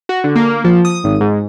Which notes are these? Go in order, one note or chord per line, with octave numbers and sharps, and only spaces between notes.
F#4
D3
A#3
F3
D#6
G#1
G#2